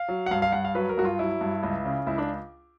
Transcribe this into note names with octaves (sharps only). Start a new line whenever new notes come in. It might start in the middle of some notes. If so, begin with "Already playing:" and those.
Already playing: F5
F#3
F#5
G2 F5
F5
G2 F#5
F5
F#3 B4
A#4
G2 F#4
F4
F#3 E4
G2
C#2
C#3
C#2 E4
D4